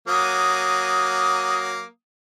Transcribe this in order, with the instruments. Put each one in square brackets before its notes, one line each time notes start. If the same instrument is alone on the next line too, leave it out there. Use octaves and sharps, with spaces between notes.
[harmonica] F#3 A#3 [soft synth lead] D#6